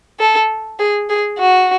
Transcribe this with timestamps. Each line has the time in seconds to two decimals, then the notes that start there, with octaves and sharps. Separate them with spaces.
0.19 A4
0.79 G#4
1.09 G#4
1.39 F#4